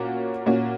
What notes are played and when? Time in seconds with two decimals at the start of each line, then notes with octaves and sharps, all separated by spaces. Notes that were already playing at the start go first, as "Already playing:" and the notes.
Already playing: A#2 A#3 C#4 F#4
0.46 A#2 A#3 C#4 F#4